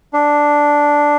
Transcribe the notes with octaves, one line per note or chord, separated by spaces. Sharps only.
D4